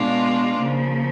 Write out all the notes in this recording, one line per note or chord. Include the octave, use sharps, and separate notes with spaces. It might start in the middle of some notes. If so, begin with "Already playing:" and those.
Already playing: B2 G#3 B3 D4 F4
C#3 F3 A#3